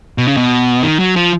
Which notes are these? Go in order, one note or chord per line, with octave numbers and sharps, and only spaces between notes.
B2
C#3
B2
D#3
F#3
F3